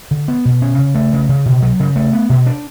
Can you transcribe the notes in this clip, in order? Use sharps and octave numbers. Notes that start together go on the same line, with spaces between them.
D3
B3
B2
C#4
C#3
A3
C#3
C#3
B2
F#3
C#3
A3
B3
B2
D4